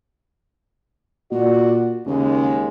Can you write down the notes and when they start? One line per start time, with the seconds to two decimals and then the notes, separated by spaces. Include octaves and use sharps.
1.32 A#2 F#4 D5
2.07 D#2 C#3 G#3